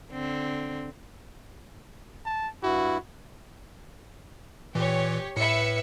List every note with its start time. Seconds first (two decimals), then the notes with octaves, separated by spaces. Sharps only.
0.12 D3 C4
2.26 A5
2.63 G2 E4 F#4
4.75 A#2 E3 G4 C#5
5.37 A2 B4 E5 C#7